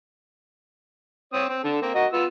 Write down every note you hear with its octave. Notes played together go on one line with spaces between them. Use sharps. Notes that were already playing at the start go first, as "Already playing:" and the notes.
C4 C#5 D#6
C4
D3 A4
A#3 C4
F#4 A#4 D#5
B3 F4 E6